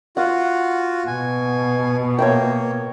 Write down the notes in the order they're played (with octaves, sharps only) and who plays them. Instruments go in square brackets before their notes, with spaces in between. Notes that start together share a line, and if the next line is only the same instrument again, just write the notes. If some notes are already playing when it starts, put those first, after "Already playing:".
[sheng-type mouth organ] F4 F#4 [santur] F5 F#5
[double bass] B2 [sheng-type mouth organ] G#5
[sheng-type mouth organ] A#3 [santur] C#5 E5 G5